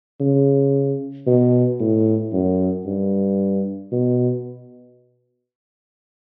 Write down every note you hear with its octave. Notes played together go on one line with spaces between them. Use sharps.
C#3
B2
A2
F#2
G2
B2